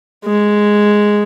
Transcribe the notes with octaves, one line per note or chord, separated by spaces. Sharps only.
G#3